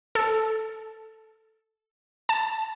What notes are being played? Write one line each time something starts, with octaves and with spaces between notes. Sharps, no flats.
A4
A5